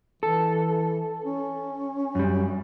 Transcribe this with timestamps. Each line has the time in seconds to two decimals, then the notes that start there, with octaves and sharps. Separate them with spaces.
0.23 E3 A4
1.25 C#4
2.15 F#2 G3